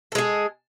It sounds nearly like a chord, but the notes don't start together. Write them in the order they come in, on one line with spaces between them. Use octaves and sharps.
A4 G#3 G#4